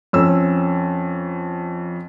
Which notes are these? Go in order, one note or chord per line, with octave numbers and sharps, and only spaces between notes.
F2 C#4 E6